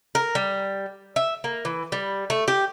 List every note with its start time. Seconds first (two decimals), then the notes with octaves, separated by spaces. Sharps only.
0.15 A#4
0.35 G3
1.16 E5
1.44 A#3
1.65 E3
1.92 G3
2.30 A3
2.48 G4